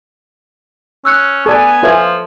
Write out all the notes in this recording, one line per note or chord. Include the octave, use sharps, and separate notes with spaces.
C#4 E6 F#6 C#7
B3 A4 D5 G#5
F3 F4 A4 B4 C#5 E5 G#6